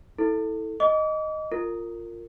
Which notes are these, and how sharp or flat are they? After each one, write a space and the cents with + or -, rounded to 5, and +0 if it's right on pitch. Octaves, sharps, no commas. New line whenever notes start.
E4 -25 A4 +0
D#5 +0 D6 -40
F4 +0 A#4 -25